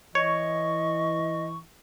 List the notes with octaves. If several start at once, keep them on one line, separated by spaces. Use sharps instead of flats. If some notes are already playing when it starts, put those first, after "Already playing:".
E3 C#5 D#5 C#6